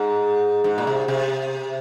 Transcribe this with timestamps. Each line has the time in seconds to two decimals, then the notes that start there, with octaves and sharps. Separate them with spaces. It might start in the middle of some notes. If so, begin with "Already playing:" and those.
Already playing: G#2
0.64 G#2
0.78 A#2
0.87 C3
1.08 C3